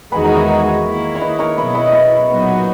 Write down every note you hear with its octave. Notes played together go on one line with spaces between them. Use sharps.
E2 D#3 G#3 D#4 F#4 G#4 B4
A#4 C#5
C#5 E5
D#3 A#3 E4
C#5
B4 D#5
A#4 C#5
B2 F#3 B3 E4 B4 D#5
B4 D#5
D#5
C#5 E5
A#2 F#3 B3 D#4 F#4